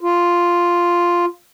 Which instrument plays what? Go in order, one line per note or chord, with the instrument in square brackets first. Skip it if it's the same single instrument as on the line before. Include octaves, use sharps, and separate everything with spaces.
[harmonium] F4